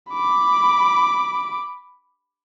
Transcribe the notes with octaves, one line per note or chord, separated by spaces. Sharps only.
B5 D6